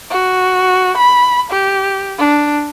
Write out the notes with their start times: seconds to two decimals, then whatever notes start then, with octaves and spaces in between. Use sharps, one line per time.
0.11 F#4
0.97 B5
1.51 G4
2.18 D4